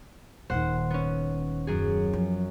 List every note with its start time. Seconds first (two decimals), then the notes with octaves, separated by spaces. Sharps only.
0.50 D#1 D#3 C5 F#5
0.90 B3 C#4
1.67 F#2 G#4
2.13 F3